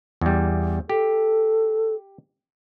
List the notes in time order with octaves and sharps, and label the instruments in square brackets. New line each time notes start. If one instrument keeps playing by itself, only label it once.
[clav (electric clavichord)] E2 G3
[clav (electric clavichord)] G4 [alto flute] A4